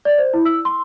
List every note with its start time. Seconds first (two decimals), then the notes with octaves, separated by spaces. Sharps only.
0.05 D5
0.18 C5
0.34 E4
0.45 E6
0.65 C6